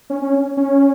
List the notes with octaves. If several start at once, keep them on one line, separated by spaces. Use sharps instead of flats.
C#4
C#4
C#4